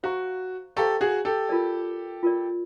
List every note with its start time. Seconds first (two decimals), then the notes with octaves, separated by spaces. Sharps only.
0.03 F#4 C5 F5 A#5 C#6
0.76 G4 A4 C5 F5 A#5 C#6
1.01 F#4 G#4
1.25 G4 A4
1.49 F4 A#4 D5
2.23 F4 A#4 D5